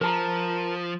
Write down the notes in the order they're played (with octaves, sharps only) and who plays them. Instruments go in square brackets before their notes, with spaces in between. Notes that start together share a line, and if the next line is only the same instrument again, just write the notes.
[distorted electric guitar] F3 [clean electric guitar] A#4 A5 A#5